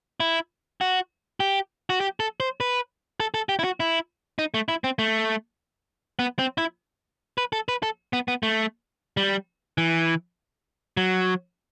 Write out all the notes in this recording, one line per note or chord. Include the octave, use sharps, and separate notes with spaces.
E4
F#4
G4
F#4
G4
A4
C5
B4
A4
A4
G4
E4
F#4
E4
D#4
A3
E4
C4
A3
B3
C4
E4
B4
A4
B4
A4
B3
B3
A3
G3
E3
F#3